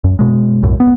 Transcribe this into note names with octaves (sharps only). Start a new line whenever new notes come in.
F#2
B2 G#3
B1 F#2 A2
B3